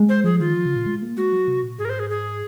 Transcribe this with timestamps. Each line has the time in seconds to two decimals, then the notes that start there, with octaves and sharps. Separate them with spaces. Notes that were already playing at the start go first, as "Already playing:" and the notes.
Already playing: G#3
0.09 C5
0.24 F3 G#4
0.40 D#3 F4
0.55 F3
0.66 C#3
0.76 A#2
0.86 G#3
1.02 A#3
1.17 G#3 F#4
1.32 F#3
1.48 C3
1.63 A#2
1.79 G#2 G#4
1.85 A#4
1.90 C5
1.99 G#4
2.10 G#4